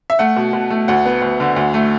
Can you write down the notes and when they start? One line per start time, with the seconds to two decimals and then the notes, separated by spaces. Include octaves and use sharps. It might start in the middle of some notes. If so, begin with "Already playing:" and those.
0.10 E5
0.19 A3 F#5
0.37 B2
0.53 B2
0.70 A3
0.88 D2 F#5
1.06 B3
1.22 D2
1.40 D3
1.56 D2
1.74 A3